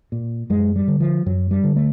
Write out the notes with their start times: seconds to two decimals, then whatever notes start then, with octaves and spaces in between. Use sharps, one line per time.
0.12 A#2
0.50 F#2 G#3
0.76 G3
0.88 D3
1.00 F3
1.26 F#2 F#3
1.51 G3
1.64 D3
1.76 A3